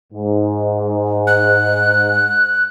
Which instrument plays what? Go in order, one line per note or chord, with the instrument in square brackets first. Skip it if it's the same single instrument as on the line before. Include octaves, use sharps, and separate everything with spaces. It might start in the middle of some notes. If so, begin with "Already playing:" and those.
[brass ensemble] G#2
[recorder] F#6